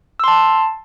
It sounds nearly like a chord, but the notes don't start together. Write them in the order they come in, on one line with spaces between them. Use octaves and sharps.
E6 C6 A5